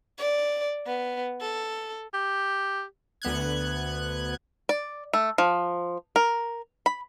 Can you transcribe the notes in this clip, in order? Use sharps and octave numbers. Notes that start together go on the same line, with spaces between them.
D5
B3
A4
G4
D2 B3 F#6 G#6
D5
A3
F3
A#4
B5